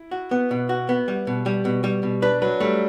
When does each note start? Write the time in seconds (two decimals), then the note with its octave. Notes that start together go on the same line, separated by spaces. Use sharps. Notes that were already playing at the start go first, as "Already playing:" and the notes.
Already playing: E4
0.11 F#4
0.31 B3
0.51 B2
0.69 F#4
0.89 B3
1.08 G3
1.27 B2
1.46 G3
1.65 B2
1.84 G3
2.03 B2
2.22 D4 B4
2.42 F#3 B4
2.60 G3 A3